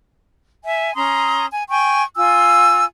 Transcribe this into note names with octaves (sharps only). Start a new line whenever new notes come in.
E5 G#5
C#4 A#5 C6 D#6
G#5
G5 G#5 C#6
F4 G#5 E6